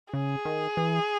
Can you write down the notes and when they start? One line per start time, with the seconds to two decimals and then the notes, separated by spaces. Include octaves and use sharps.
0.14 C#3 G#4
0.45 D#3
0.77 E3